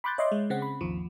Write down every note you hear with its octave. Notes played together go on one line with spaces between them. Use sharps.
B5 C6 D6 F#6 G6 A6
C#5 D#5 E5 C6 D6
G#3
C#3 C4 F#5
B5
G#1 D#2 F3